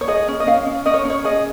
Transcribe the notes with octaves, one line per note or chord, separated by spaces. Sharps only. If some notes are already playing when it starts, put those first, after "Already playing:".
C#5
G#4 D#5
C#4
D#5
C#4 F5
C#4
C#4 D#5
C#5
C#4 C#5
G#4 D#5